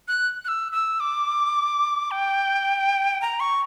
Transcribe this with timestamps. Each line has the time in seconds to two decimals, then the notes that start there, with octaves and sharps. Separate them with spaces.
0.08 F#6
0.45 F#6
0.48 E6
0.72 E6
1.00 D6
2.11 G5
3.22 A#5
3.40 C#6